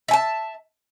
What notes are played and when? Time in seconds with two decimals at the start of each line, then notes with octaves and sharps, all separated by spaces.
0.08 E5
0.11 G#5
0.13 A5